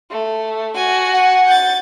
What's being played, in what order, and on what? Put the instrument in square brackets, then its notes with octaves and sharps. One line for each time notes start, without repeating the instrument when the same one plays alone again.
[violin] A3
F#4 G#5
[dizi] F#5
[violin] G6 A6